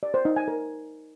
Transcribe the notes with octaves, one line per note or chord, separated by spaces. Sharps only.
D5
C5
D#4
G#5
A#4